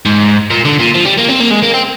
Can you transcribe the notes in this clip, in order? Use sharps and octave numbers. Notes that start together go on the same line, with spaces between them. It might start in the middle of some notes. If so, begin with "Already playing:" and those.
G#2
A#2
D3
A#2
F3
G3
A#3
C4
A#3
G#3
A#3
C4